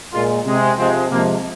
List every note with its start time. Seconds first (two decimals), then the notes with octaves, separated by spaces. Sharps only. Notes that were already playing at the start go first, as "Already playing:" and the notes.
0.13 A#2 G#3 F4
0.46 C3 G#3
0.78 C3 F3 G#3 C4
1.10 C3 F3 G#3 A#3